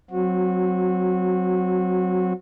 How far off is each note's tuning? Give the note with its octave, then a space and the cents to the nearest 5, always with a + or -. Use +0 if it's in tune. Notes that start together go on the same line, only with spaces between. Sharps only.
F#3 +0 C4 +0 F#4 -20